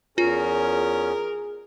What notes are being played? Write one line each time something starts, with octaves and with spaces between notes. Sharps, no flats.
E2 C#4 F4 G#4 A#4